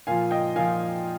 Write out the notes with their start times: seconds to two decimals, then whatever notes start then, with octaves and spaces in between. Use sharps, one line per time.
0.07 A#2 F3 F5 G#5
0.31 D#5 G5
0.56 A#2 F3 F5 G#5